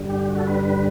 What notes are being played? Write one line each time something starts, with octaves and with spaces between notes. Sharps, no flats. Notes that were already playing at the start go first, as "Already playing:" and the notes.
Already playing: G2 D3 G3
G4
F#4
A4
B4
B4